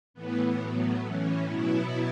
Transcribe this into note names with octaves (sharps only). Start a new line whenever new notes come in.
A2 E3 B3
A2 F#3 B3
A2 E3 C#4
B2 F#3 B3 E4